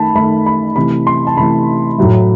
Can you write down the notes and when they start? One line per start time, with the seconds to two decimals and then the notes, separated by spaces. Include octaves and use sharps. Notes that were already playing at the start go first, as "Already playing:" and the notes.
Already playing: D#3 A3 A5 B5
0.15 D#3 A3 B5
0.46 B5
0.76 C3 E3 A3 B5
1.07 C6
1.27 A5
1.37 C3 E3 A3 B5
1.98 A2 F#3 A3